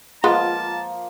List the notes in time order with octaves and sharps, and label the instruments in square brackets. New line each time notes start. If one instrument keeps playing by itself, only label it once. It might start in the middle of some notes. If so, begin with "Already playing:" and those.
[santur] F3 A#3 [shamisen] G#3 B3 [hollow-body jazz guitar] F4 [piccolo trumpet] A5